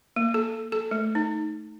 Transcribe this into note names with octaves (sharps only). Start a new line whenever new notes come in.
A#3
A4
A4
A3
D#4